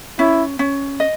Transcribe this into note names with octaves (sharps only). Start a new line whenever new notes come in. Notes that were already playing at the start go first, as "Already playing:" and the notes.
C#4 E4
C#4
D#5